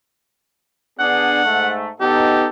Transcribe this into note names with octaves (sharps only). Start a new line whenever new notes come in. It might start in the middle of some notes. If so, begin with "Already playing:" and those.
B3 D4 G#4 F#5
G#2 A3
B3 D#4 G4 A4